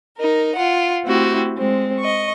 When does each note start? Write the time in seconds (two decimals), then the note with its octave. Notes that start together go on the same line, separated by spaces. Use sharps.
0.18 D#4 A#4
0.56 F4 F#5
1.04 A3 C4 E4 F#4 G4
1.58 G#3 C4
1.99 D#5 C#6